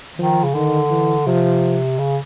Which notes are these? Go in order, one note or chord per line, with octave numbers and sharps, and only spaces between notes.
D#3 F3
C#3
D3 D#3
E3
C3 F3
C#3